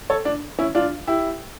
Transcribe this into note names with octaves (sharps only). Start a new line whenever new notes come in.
A4 C#5
D4
C#4 E4
D4 F4
E4 G4